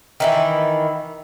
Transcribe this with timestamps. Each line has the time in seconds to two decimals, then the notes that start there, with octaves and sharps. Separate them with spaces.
0.20 D#3 E3 E4